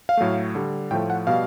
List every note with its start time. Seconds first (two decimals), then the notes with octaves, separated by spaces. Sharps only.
0.09 F5
0.17 A2 F#3 A3
0.55 D3 G3
0.91 A2 G5
0.93 F3 A3
1.10 F#5
1.27 B2 G3 F5